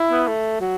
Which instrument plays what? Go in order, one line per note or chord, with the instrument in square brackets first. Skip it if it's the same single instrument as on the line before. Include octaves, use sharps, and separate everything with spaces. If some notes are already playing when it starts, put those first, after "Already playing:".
Already playing: [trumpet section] E4
[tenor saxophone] B3
A3
F#3